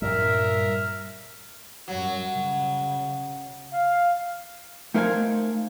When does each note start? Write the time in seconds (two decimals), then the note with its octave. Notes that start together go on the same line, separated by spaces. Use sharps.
0.02 G2 A#2 G3 A#4 E5
1.88 F#2 F#3 G3
2.35 C#3
3.72 F5
4.94 A3 D#4 A#4 C5 F5 G#5